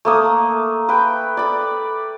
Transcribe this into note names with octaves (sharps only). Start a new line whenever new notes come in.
A3 A#3 D#6
B4 G5
D5 B5